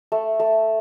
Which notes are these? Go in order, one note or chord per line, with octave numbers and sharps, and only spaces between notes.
A3
A3